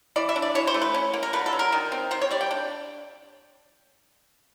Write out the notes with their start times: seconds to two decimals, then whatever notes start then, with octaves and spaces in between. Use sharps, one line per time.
0.16 E3 D5
0.29 E5
0.36 D4
0.42 D5
0.55 E3 C#5
0.67 C5
0.74 A3
0.82 B4
0.94 C#4
1.13 A#3
1.23 A#4
1.33 D3 B4
1.46 A4
1.53 F#3
1.59 A#4
1.72 D#3
1.92 C4
2.11 D#3 C5
2.21 C#5
2.31 G3 D5
2.41 G5
2.51 D4